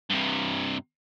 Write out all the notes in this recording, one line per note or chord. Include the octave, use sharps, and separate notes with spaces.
G2 C3